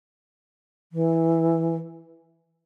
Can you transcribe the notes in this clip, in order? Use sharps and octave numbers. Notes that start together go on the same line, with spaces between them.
E3